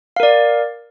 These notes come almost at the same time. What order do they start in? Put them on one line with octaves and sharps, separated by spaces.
F5 A#4 D5